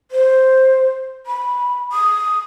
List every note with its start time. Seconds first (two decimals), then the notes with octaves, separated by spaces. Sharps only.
0.11 C5
1.27 B5
1.92 D#6